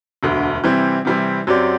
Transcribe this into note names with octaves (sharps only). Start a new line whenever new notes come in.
E1 D2 D3
C3 E3 G3 C4 E4
C3 E3 G3 C4 E4
F#2 F#3 C4 G4 D5